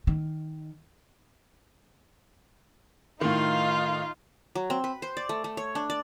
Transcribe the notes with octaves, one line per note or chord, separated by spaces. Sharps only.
D#3
A2 D#3 D#4 F4 F5
F#3
C4
B4
C5
D5
A3
A3
C#5
D4
D5